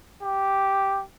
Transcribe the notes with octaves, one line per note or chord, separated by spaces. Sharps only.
G4